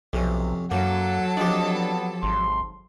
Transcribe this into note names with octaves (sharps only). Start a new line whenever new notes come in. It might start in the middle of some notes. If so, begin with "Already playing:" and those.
B1 F2 C3 C#4
F#2 F#3 A#3 A4 F#5 A5
F3 C4 D4 G4 D#5
B3
G#1 C6